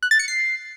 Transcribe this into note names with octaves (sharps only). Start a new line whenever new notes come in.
F#6
A6
C#7
C7